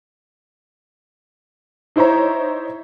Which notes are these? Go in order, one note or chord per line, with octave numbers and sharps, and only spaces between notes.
D#4 E4 C5 C#5 A#5